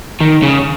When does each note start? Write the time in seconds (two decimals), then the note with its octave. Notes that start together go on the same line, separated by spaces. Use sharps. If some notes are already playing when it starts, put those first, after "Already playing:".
0.20 D#3
0.42 C#3